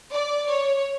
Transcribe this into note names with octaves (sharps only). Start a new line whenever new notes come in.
D5
C#5